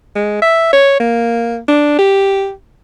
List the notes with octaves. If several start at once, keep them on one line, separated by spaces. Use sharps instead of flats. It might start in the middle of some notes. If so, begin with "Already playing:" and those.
G#3
E5
C#5
A#3
D4
G4